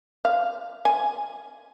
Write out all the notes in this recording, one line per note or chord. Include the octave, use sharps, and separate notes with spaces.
F5
G#5